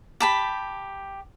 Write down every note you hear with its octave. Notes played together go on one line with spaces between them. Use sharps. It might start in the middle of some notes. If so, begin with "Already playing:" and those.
G4 A5 B5